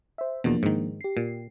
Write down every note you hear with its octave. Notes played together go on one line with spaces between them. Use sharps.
C5 E5
E2 B2 F3 A#3 D4
G#2 D#3
G4 C7
A#2